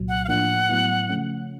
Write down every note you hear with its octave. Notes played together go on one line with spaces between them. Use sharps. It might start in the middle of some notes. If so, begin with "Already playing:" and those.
Already playing: C2 A#2 F#3
F#5
F5
A2 F3 A#3 D4 F#5
A2 F#3 B3 E4
C#3 F3 A3 C#4